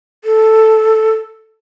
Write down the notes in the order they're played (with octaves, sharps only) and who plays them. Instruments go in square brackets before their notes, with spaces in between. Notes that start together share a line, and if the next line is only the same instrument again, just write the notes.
[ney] A4